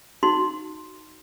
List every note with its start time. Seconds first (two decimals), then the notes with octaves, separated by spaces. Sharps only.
0.23 D#4 F#4 C6